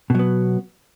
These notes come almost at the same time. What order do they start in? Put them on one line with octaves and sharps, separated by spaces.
B2 F#3 B3